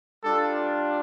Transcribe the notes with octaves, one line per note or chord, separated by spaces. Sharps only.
G3 D4 F4 A4